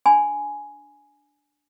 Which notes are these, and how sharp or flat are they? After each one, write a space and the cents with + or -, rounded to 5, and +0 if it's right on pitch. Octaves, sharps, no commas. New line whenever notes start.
D4 +0 G#5 +5 B5 +30